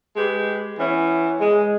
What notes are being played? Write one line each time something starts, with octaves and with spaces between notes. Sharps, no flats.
G#3 G4 B4
E3 B3 C#4
G#3